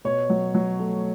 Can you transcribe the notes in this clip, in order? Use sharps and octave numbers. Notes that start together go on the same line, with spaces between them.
B2 C#5
F#3
F#3
A3